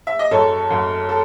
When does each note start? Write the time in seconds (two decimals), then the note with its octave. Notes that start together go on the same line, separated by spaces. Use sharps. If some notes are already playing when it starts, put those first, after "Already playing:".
0.07 E5
0.19 D#5
0.31 F#2 A4 C#5
0.70 F#2
1.09 A4